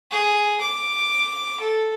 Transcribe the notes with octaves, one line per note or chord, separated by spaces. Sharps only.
G#4
D6
A4